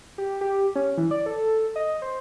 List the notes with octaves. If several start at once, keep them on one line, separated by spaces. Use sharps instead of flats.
G4
G4
C#4
E3
D5
A4
D#5
C5